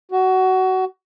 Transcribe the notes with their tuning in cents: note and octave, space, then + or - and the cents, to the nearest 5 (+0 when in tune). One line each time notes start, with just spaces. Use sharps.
F#4 +20